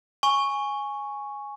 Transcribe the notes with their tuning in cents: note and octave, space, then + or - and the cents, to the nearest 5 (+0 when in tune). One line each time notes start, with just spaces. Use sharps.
G#5 +0 C#6 +0